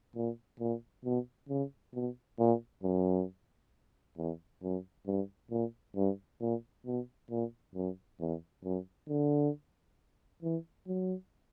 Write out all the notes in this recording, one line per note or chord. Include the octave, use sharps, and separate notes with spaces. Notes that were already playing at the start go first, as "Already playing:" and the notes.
A#2
A#2
B2
C#3
B2
A#2
F#2
E2
F#2
G2
A#2
G2
A#2
B2
A#2
F#2
E2
F#2
D3
E3
F#3